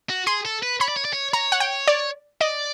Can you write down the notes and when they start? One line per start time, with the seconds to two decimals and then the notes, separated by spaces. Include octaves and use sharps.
0.10 F#4
0.27 G#4 C6
0.45 A4
0.63 B4
0.80 C#5 B5
0.88 D5
0.97 C#5
1.05 D5
1.13 C#5
1.33 C#5 A#5
1.52 F#5
1.60 G5
1.87 D5
2.41 D5 D#5